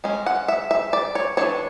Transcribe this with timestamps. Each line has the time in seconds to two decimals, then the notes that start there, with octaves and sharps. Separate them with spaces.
0.04 G#3 C#4
0.26 F#5
0.48 E5
0.71 E5
0.93 D5
1.15 C#5
1.37 E3 A3 D4 C#5